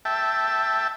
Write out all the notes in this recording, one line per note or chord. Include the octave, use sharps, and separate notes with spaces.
E5 G5 A5